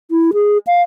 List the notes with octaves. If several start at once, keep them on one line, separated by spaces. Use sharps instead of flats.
E4
G#4
F5